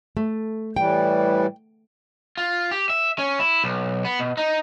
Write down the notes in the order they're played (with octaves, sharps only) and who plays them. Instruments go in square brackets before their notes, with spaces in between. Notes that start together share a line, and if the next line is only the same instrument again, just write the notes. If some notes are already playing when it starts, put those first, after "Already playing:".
[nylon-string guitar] A3
[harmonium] A2 E3 G3 [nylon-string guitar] G5
[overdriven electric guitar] F4
G4
E5
C#4
E4
B1
B3
B2
D#4